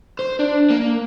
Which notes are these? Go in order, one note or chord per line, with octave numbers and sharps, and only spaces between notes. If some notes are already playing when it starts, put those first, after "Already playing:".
C5
D4
A#3